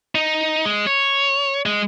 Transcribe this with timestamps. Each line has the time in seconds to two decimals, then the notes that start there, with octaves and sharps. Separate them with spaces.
0.15 D#4
0.65 G#3
0.87 C#5
1.66 G#3